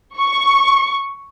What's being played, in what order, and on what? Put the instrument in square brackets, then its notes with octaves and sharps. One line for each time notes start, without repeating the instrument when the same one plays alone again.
[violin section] C#6